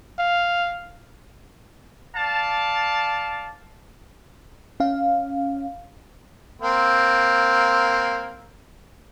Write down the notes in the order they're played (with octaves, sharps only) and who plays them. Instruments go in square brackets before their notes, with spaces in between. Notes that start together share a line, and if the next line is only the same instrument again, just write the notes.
[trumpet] F5
[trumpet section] D5 F5 A5
[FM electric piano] C#4 F5
[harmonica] A#3 C4